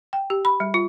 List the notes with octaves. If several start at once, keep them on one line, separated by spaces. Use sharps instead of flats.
G5
G4
B5
G3
F4